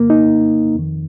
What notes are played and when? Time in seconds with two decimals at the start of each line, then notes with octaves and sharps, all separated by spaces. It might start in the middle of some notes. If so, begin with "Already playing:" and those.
Already playing: F2 C#3 A#3
0.10 D#4
0.75 F2 D#3